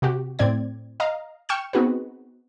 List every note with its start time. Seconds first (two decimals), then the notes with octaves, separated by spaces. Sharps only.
0.02 C3 F#4 G4
0.39 A2 C4 D5 G#6
1.00 D#5 F5 A#5
1.49 G5 C#6 F6 G6 C#7 E7
1.73 B3 C4 D#4 F#4 G#4 B4